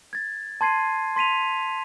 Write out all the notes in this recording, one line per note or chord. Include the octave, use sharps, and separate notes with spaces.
G#6 A6
A5 C6 G#6 C7 D#7
C6 B6 D#7 F7